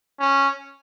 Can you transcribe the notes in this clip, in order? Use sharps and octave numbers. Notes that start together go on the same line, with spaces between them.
C#4